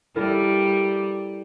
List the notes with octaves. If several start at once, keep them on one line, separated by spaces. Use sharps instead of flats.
G3 E4 A4 A#4